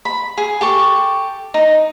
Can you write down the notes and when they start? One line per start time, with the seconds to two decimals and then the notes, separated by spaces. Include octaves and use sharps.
0.05 B5
0.38 G#4
0.61 G4 A4 C#6
1.54 D#4